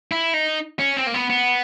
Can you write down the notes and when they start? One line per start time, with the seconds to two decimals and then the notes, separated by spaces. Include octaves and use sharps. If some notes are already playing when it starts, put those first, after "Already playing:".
0.12 E4
0.34 D#4
0.79 C#4
0.97 C4
1.07 A#3
1.14 B3
1.30 B3